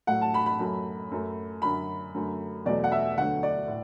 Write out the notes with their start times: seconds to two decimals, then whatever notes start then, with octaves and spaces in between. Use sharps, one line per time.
0.07 A2 F#3 A3 F#5
0.21 A5
0.34 B5
0.46 B5
0.59 F#2 F#3 A3
1.12 F#2 F#3 A3
1.62 F#2 D3 F#3 B5
2.14 F#2 D3 A3
2.65 E2 B2 F#3 A3 D5
2.84 F#5
2.92 E5
3.17 D2 D3 F#3 A3 F#5
3.43 D5
3.68 A2